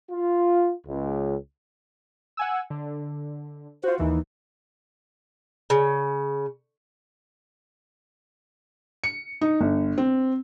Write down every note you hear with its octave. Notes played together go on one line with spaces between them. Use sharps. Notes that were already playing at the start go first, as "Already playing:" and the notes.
F4
C#2
F#5 G#5 E6
D3
F4 F#4 C5
D#2 E3 D#4
C#3
C#7
D#4
G1
C4